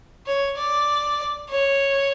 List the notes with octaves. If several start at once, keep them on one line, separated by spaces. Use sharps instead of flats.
C#5
D5
C#5